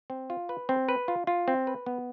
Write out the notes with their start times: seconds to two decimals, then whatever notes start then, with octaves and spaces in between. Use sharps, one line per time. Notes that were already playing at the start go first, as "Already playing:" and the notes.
0.10 C4
0.30 F4
0.49 B4
0.69 C4
0.88 B4
1.08 F4
1.27 F4
1.48 C4
1.67 B4
1.86 B3